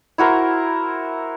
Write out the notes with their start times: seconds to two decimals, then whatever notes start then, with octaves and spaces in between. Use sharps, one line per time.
0.18 E4 F#4 A#4 C5